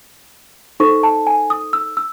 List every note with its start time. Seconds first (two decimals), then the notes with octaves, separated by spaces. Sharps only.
0.80 D#4 A4 C5 C#6
1.03 A5
1.27 G#5
1.50 D#6
1.73 E6
1.97 E6